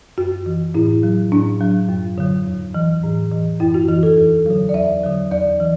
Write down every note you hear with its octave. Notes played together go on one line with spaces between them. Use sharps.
F#2 F#4
E3
A2 E4
F#3
A2 D4
F#3
F#2
D3 F#3
E2
E3
A2
E3
F#2 E4
F#4
E3 F#4
A4
E2
D3 F#3
D5
E2 E5
D3 F#3
E2 D5
E3